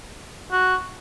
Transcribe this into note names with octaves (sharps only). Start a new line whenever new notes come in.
F#4